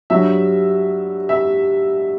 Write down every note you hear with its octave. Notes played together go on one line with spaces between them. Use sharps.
G2 F#3 E5
E5